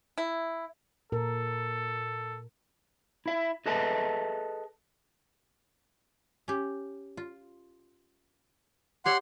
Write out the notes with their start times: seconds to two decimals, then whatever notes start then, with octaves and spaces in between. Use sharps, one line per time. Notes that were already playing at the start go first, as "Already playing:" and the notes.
0.18 E4
1.12 A#2 A4 A#4
3.26 E4 E5
3.66 G#4 A4 B4 D#5 E5 A5
6.48 C#4 G4
7.17 F4
9.06 G4 C#5 E5 F#5 C6